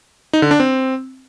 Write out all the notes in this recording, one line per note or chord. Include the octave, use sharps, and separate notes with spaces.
D#4
D3
D4
C4